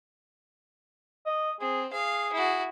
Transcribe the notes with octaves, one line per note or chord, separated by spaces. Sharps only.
D#5
C4 G#4
G#4 F5
E4 F#4